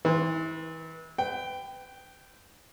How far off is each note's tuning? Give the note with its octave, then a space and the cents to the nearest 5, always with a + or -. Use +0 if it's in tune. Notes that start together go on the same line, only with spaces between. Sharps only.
E3 -35 C6 +0
B4 +30 G5 +0